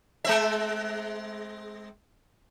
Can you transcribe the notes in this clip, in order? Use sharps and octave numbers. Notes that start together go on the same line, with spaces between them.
G#3 C4 E5